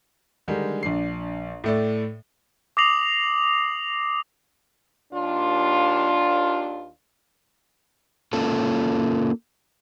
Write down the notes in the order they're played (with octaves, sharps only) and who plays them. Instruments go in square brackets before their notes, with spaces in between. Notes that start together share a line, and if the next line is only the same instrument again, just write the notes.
[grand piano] D3 D#3 G3 G#3
A#1 D4 C7
A2 A3 D5
[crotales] D6 D#6 A#6 C7 F7 F#7
[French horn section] D#2 D4 F4
[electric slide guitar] A#3 C#4 F4 A4